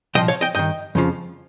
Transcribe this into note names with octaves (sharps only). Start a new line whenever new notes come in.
C2 A#2 F3 D#5 G5
C#5 F5
D#5 G5
G2 D#3 D#5 G5
F2 C#3 F3